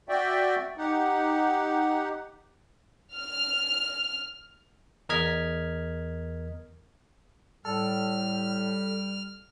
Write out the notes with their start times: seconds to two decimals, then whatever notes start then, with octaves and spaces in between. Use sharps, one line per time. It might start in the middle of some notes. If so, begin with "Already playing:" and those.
0.09 F#4 D5 E5 G5
0.78 D#4 G4 F#5
3.14 F6
5.09 E2 A#4 D#5 F6 G#6 B6
7.65 A2 G3 A4 F6